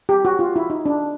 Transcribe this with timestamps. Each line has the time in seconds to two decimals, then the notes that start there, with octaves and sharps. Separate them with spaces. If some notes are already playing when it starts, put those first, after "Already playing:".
0.09 G4
0.25 F#4
0.39 F4
0.56 E4
0.70 D#4
0.86 D4